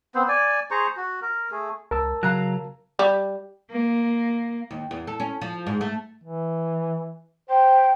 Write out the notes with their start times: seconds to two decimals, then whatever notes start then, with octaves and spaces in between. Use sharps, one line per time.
0.15 B3 C4 C5
0.28 D5 G#5
0.71 G#4 C5 A#5 C#6
0.97 F#4
1.22 A#4
1.52 A3 G#4
1.91 C#2 A#4 A5 E6
2.23 C#3 F#3 F5 A#5 F#6
2.99 G3
3.71 A#3
4.71 D#2
4.91 E2
5.07 A4
5.20 C#4
5.41 F3
5.67 G#2
5.81 A3
6.24 E3
7.50 C5 G5